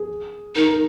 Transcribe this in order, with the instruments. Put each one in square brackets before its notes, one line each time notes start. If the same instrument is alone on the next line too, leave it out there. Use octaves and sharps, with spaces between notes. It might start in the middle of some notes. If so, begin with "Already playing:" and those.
Already playing: [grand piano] G#4
[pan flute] D#4 [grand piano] A#4
[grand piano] A#4